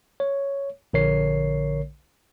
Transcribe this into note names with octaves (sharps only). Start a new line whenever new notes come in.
C#5
A#1 D3 A#4 C#5 C7